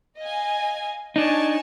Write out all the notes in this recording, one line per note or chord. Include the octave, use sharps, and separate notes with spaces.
D#5 F5 G#5
D4 D#4 C#5 G#5 A5